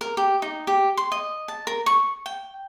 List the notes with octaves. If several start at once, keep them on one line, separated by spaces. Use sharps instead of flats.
A#4
G4
D#4
G4
C6
D#5
A5
A#4
C#6
G5